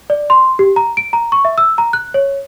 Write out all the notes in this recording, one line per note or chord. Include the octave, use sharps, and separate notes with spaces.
D5
C6
G4
A#5
D7
A#5
C#6
E5
E6
A#5
F#6
C#5